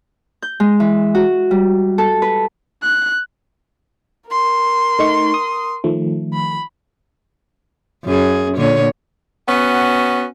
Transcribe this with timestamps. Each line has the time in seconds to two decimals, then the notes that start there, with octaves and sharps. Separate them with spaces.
0.42 G6
0.60 G#3
0.80 E3
1.15 F#4
1.51 G3
1.98 A4
2.22 B4
2.83 F#6
4.30 A#4 C6
4.99 A3 D#4 C#6
5.34 D#6
5.84 D#3 F3 A3
6.34 B5
8.05 F#2 G#4
8.57 A#2 D3 C#5
9.47 B3 C#4 F#4